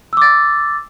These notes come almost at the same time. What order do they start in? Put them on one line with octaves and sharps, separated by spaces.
E6 D6 A6